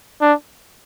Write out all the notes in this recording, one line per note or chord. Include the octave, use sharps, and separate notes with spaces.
D4